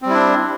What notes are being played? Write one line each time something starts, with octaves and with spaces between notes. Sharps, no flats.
G3 C4 D4 E4